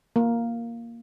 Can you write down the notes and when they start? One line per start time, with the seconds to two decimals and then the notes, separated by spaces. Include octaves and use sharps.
0.16 A#3